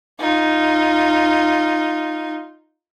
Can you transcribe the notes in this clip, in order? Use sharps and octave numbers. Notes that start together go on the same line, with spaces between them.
D#4 F4